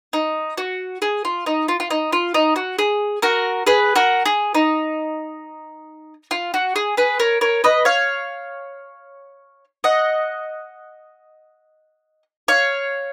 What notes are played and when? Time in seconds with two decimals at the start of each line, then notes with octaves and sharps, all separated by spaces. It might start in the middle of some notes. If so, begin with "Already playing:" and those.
0.13 D#4
0.58 F#4
1.02 G#4
1.25 F4
1.46 D#4
1.68 F4
1.80 F4
1.90 D#4
2.13 F4
2.34 D#4
2.56 F#4
2.79 G#4
3.22 F#4 A#4
3.67 G#4 B4
3.96 F#4 A#4
4.25 G#4
4.55 D#4
6.31 F4
6.54 F#4
6.76 G#4
6.97 G#4 B4
7.20 A#4 C#5
7.41 A#4 C#5
7.64 B4 D#5
7.85 C#5 F5
9.84 D#5 F#5
12.48 C#5 F5